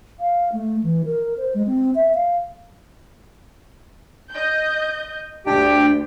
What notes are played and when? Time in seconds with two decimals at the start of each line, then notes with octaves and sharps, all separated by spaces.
0.20 F5
0.53 A3
0.84 E3
1.06 A#4
1.38 C5
1.54 G#3
1.67 C4
1.95 E5
2.15 F5
4.32 D#5 G6
5.46 D2 D4 G4 G5